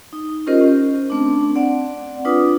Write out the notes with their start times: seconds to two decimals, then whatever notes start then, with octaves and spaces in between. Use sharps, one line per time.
0.13 D#4
0.47 C#4 F4 G4 A#4 C5 D#5
0.61 C#4
1.10 A3 C4 D4
1.56 C4 D5 F#5
2.25 D4 F4 B4 D#6